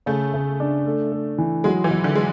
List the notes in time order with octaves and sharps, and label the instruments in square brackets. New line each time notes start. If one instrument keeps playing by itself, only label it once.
[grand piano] C#3 [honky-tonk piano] A3
[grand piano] C#3
D4
A3
A3
E3
[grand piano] F#3 [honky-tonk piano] G#3
[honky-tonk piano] E3
[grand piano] F#3
[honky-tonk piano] D3
G#3